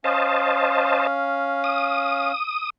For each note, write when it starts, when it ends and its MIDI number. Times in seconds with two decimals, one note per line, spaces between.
0.04 2.32 61
0.04 1.07 72
0.04 1.07 75
0.04 2.32 77
0.04 1.07 81
1.64 2.70 87